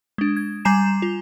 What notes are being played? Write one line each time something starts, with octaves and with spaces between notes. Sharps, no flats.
G#3 D4
G#6
G3 G#5 A#5 C7 E7
F4